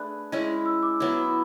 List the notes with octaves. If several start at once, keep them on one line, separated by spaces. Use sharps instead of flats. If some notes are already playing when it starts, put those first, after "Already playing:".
Already playing: A3 D4 G#4 B4 F#6
G#3 C#4 E4
E6
D6
F#3 B3 E4